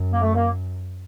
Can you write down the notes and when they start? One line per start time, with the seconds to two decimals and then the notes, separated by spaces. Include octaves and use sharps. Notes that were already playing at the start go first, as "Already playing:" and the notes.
Already playing: F#2
0.12 A#3
0.22 A3
0.34 A#3